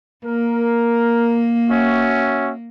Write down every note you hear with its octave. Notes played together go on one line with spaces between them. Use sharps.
A#3 A#4
C#4 F#4 E5